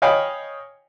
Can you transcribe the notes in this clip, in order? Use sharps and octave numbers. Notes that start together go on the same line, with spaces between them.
C#5 D#5 F5 G5 G#5 B5